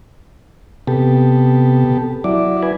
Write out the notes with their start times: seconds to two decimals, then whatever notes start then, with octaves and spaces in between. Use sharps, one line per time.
0.87 C3 B3 G4 A4
2.24 F#3 E4 D5
2.63 B4 G#5